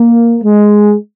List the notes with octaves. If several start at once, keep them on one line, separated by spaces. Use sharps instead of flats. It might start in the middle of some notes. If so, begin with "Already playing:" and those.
Already playing: A#3
G#3